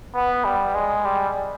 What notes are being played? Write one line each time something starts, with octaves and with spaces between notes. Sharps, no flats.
B3
G3
G#3
G3